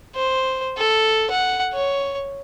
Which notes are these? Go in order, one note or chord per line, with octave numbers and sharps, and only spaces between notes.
C5
A4
F#5
C#5